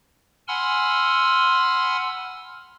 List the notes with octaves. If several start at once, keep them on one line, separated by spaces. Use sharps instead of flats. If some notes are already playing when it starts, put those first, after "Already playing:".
F#5 G#5 B5 C6 E6 F6